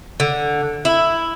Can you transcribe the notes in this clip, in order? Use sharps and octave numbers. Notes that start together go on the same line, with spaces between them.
D3
E4